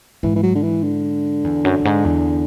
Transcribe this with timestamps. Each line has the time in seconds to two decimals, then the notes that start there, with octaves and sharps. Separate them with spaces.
0.23 G#2 E3
0.36 E3
0.43 F#3
0.55 D3
0.63 E3
0.83 D3
1.44 E2
1.65 F#2
1.80 F#2
1.85 G#2
2.05 E2